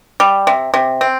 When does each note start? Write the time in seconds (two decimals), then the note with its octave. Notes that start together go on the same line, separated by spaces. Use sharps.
0.20 G3
0.47 C3
0.74 C3
1.01 C4